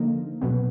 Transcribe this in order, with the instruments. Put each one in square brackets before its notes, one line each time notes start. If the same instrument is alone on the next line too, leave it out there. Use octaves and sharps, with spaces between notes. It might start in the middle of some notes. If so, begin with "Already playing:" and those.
Already playing: [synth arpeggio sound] D3 F3 A#3 D#4
B2 F#3 B3